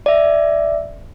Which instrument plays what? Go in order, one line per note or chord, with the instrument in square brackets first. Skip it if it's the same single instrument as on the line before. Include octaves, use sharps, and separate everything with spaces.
[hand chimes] D5 E5